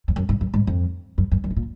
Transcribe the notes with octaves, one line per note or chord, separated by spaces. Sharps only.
F2
F#2
G#2
F#2
G#2
F2
F#2
F#2
F#2
G#2
A#2